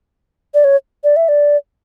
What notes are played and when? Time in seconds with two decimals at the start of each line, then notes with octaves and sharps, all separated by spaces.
0.54 D5
0.64 C#5
1.04 D5
1.16 E5
1.29 D5